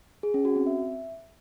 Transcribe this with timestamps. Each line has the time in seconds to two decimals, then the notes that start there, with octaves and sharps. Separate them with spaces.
0.23 G#4
0.34 C#4
0.45 F#4
0.56 C4
0.67 E5